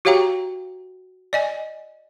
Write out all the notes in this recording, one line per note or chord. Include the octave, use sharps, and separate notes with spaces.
F#4 G4 C#5 F5 G5 A#5
D5 D#5 G#5